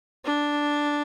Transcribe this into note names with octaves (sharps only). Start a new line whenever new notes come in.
D4